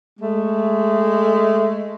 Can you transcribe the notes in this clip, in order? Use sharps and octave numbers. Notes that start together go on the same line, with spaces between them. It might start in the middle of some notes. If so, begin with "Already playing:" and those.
G#3 A3